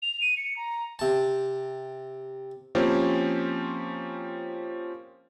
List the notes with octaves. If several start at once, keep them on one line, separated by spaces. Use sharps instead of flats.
F7
D#7
C#7
A#5
C3 A5
F3 A#3 C4 C#4 G4 C5